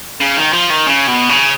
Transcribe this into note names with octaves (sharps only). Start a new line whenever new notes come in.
C#3
D#3
F3
D#3
C#3
B2
C#3